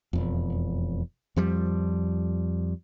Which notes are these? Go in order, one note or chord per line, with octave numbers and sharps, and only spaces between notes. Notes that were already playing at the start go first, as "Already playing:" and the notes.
E1 F2
F2 F3 G3